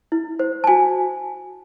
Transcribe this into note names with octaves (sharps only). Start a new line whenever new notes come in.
E4
C5
A5
F#4 G#5